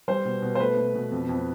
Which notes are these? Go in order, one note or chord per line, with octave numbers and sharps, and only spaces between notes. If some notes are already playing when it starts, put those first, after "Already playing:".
G3 C5
B2
B2
C5
A3 B4
B2
B2
F2
F2